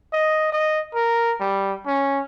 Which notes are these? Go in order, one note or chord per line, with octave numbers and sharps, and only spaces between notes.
D#5
D#5
A#4
G3
C#4